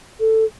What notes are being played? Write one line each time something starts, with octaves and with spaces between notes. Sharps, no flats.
A4